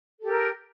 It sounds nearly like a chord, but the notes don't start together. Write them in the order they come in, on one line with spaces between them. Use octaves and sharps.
A4 G4 A#4